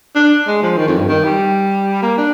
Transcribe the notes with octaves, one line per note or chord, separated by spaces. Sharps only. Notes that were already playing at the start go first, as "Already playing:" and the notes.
D4
G#3
F3
D#3
F2
G2
D#3
G3
A#3
D4